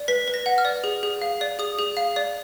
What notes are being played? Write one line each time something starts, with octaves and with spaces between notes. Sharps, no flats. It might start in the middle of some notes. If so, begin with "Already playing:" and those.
Already playing: D5
B4 B6
B4
A#6
F#5
F6
D5
G#4
G#4
F5
D5
G#4 D#6
G#4
F5
D5